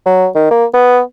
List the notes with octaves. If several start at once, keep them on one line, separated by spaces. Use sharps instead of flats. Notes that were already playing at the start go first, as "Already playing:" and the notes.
F#3
D#3
A#3
B3